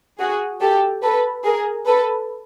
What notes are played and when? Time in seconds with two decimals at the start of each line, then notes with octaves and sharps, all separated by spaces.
0.19 F#4 G#4
0.61 G4 A4
1.03 A4 B4
1.45 G#4 A#4
1.87 A4 B4